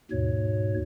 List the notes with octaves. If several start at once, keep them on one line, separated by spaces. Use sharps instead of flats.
D#2 G#2 B2 C#5